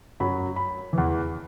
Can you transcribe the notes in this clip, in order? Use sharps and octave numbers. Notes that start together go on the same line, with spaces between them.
F#2 F#3 B5
B5
E2 E3